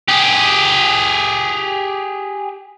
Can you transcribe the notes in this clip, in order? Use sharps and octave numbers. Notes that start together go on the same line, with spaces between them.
G4 G#4